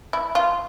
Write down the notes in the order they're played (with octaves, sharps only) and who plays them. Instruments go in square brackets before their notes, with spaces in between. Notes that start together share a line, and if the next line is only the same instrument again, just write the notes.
[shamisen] E4
F4